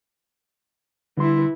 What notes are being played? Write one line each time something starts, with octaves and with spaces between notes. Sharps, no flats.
D3 E3 G3 E4 C6